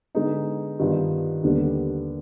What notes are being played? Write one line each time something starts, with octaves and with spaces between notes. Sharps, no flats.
D3 G#3 B3 D#4
G2 D#3 B3 D4 F4
D#2 D3 G3 B3 D4